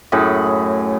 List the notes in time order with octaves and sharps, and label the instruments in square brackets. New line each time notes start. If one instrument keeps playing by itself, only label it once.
[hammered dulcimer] F#2 A2 G#4 B5